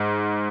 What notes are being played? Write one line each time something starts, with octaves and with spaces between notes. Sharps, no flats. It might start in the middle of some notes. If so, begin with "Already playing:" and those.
Already playing: G#2